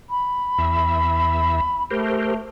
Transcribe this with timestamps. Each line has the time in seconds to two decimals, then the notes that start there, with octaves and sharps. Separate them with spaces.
0.09 B5
0.58 E2 E5
1.91 A3 G4 A#4 C5